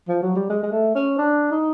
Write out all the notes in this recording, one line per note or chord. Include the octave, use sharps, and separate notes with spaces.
F3
F#3
G3
G#3
G#3
A3
C#4
D4
D#4